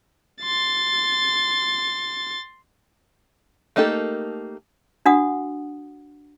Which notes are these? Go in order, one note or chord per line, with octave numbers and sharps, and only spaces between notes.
C6 A6
A3 A#3 D#4 G4 A4
D4 F#4 F#5 D#6